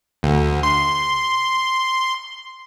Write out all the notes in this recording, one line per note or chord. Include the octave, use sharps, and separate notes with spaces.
D2
C6